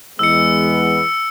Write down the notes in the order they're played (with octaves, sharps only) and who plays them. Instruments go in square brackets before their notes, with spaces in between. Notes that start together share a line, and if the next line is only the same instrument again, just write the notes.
[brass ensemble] E2 G#3 B3 [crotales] E6 C#7